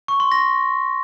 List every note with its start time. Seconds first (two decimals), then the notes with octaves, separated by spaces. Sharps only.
0.08 C#6
0.20 C6
0.32 A#6